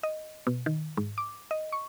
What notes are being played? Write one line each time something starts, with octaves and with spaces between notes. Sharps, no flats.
D#5
B2
D#3
G#2
D6
D#5
C#6